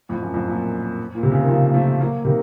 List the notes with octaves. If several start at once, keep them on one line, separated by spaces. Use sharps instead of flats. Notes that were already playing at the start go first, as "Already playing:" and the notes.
F2 A2
F#2
F2 A2
F#2 A#2
A#2
C3
C#3
D#3
C#3 F3
A#3
F3 A3
F#3 A#3
C3 D#3